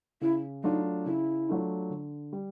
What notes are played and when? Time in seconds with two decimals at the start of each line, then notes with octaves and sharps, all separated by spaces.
0.21 C#3 E4
0.64 F#3 A3 D4 D#4 F4
1.06 C#3 E4
1.49 F#3 A3 D4 F4
1.90 D3
2.33 G3